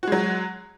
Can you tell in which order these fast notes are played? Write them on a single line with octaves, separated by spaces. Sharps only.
F#4 G#3 F#3